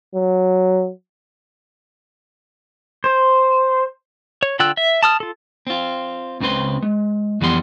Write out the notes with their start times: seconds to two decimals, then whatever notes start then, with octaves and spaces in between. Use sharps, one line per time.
0.14 F#3
3.04 C5
4.43 C#5
4.59 D3 F4 G5 E6 F#6
4.77 E5
5.03 A5 D#6 F6
5.20 F4 A4
5.67 C4 F4
6.40 C#2 C#3 C4 B4 C6
6.82 G#3
7.41 F2 E3 G3 B3 B5 C6